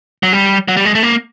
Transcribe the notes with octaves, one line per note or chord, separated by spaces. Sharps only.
F#3
G3
F#3
G3
G#3
A3
A#3